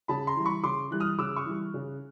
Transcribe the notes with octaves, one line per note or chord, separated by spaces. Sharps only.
C#3 A5 B5
A#5 C6
E3 G3
B5 C#6
C#3 C6 D6
E3 G3 F#6
D#6 F6
C#3 D6 E6
C#6 D#6
E3 G3
C#3